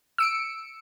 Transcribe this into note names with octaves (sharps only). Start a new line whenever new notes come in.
E6 C#7 D7